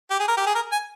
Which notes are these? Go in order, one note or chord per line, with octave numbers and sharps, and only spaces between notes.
G4
G#4
A#4
G4
G#4
A#4
G#5